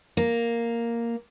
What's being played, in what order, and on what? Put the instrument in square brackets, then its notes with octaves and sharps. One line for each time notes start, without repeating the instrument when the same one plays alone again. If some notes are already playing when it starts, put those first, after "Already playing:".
[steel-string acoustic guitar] A#3